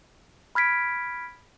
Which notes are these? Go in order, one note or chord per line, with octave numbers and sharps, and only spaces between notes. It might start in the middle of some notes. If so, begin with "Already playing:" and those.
B5 F6 G#6 B6 D7